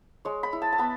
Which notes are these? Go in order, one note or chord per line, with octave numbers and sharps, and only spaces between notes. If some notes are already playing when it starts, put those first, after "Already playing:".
G#3 C#5
B5
E4
A5
A5
B3 B5